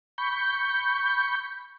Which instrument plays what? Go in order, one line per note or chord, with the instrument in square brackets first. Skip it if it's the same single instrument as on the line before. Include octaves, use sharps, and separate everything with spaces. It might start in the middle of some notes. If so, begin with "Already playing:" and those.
[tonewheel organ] B5 C#6 G6